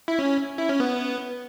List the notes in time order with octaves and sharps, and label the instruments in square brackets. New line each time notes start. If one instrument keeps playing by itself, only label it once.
[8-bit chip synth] E4
C#4
E4
C#4
B3